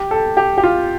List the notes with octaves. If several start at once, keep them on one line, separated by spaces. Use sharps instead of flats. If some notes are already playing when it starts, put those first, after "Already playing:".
Already playing: G4
A4
G4
G4
F4